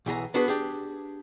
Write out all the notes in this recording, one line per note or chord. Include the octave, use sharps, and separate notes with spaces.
B1 E3 G#4 A#5
B3 D4 F#4 G#4 B4
D4 G4 G#4